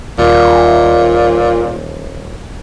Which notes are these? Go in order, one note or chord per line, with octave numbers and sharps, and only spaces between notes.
D#1 A#2